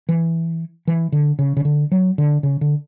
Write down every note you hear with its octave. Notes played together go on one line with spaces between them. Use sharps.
E3
E3
D3
C#3
C#3
D3
F#3
D3
C#3
D3